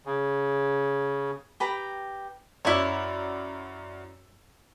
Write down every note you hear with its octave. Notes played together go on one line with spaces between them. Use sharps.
C#3
G4 B4 G5 A#5
F#2 E4 C#5 D5 E6